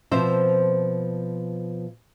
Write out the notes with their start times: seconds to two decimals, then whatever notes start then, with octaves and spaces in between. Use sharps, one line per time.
0.11 B2 F3 C4 C5 E5